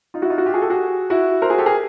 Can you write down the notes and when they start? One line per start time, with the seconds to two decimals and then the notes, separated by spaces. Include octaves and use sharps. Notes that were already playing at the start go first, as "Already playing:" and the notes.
0.14 D#4 F4
0.22 E4 F#4
0.30 D#4 F4
0.38 E4 F#4
0.46 F4 G4
0.54 F#4 G#4
0.62 G4 A4
0.70 F#4 G#4
1.10 E4 F#4
1.42 A#4 C5
1.50 F#4 G#4
1.58 G4 A4
1.66 G#4 A#4